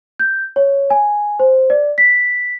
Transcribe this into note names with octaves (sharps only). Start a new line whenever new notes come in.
G6
C#5
G#5
C5
D5
B6